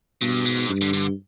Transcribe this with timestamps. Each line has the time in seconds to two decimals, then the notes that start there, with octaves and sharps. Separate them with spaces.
0.21 G2 B2
0.45 G#2
0.69 G2
0.82 D3
0.93 D3